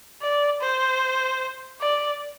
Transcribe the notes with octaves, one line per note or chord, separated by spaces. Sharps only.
D5
C5
D5